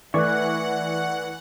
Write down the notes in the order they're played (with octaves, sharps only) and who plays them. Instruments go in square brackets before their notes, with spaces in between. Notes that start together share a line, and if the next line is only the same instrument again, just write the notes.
[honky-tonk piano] E3 [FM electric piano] A3 D5 C#6 [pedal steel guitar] E5 F#6 [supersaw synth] F#5